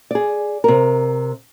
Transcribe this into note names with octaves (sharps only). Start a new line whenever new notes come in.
G#4 D5
C3 A#4